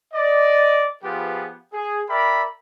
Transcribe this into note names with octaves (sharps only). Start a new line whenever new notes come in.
D5 D#5
F3 B3 F4 G4 G#4 B4
G#4
A#4 D5 E5 G5 B5